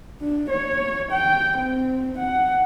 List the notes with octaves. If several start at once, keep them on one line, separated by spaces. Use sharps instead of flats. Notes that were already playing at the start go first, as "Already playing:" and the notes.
D4
C#5
G5
C4
F#5